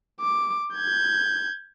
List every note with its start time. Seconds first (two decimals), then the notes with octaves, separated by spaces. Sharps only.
0.21 D6
0.75 G6 G#6